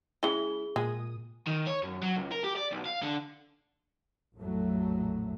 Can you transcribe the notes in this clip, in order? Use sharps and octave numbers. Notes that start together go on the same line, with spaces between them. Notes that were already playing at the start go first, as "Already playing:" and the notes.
C#3 G#3 E4 G#4 G7
A#2 G#3 D#6
D#3
C#5
F#2
F#3
C#2
A#4
G4
D5
B1
F5
D3
A#1 F2 A2 F#3 A3